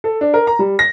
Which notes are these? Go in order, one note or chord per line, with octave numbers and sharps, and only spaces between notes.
A4
D4
A#4
A#5
G3
A#6